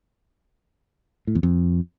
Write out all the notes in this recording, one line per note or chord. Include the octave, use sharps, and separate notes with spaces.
A2
E2
F2